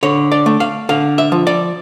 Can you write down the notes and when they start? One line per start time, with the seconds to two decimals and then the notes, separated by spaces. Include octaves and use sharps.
0.03 D3 C#5
0.32 D5
0.46 A3
0.60 F5
0.89 D3 F5
1.18 E5
1.32 F3
1.47 D5